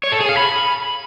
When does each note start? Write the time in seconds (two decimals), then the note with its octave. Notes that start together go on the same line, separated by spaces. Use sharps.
0.04 C#5
0.12 A4
0.20 G#4
0.29 F5
0.37 B5